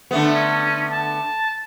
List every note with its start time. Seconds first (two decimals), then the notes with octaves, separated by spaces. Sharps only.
0.11 D3 A3 B3
0.35 C#4
0.92 A5